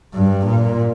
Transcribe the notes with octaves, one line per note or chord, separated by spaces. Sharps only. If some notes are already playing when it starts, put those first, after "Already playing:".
G2
A#2